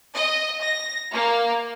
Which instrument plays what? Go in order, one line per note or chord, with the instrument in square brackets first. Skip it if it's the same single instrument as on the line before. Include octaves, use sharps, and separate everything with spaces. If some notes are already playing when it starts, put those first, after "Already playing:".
[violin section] D#5
A#6
A#3